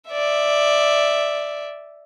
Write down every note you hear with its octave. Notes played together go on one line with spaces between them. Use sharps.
D5 E5